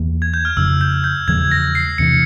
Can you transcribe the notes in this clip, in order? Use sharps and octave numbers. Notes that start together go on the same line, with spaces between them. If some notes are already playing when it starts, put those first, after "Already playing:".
Already playing: E2 E3 A#3
G#6
G6
F6
F2 C#3 F3 E6
G6
G6
E2 C#3 F3 G#3 G#6
A#6
C7
E2 C3 E3 C#7